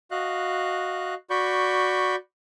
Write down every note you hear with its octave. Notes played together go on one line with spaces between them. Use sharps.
F#4 D#5 F5 F#6
F#4 D5 B5 C#6 G6